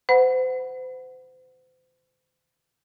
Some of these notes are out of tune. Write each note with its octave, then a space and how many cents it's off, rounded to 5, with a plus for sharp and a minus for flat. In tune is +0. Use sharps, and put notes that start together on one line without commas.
C5 -35 F#5 +0 B5 -15